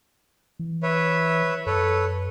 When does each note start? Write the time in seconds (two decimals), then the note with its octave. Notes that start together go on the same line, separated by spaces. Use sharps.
0.59 E3
0.83 B4 C#5 E5
1.67 F#2 A4 B4 C#5